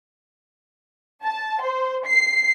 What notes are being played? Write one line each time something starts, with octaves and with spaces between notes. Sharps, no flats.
A5
C5
C7